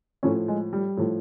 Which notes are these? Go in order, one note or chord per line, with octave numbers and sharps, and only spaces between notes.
A2 F3 C#4
G#3
G3
A2 F3